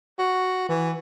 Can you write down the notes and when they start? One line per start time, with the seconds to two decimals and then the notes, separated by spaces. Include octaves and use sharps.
0.19 F#4
0.69 E3